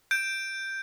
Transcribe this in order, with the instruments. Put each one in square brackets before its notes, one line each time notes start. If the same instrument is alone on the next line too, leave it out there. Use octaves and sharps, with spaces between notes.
[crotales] G6 D7